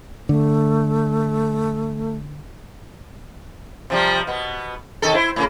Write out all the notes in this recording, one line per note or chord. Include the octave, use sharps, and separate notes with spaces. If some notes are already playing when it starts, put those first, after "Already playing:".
D3 A3
C3 F3 G3
B2 B3
C3 D#3 A4
E4 C5
A2 C#3 A#3